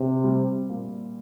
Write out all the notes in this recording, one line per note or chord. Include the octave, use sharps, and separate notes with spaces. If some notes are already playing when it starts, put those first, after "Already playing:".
Already playing: C3 C4
G3
A#2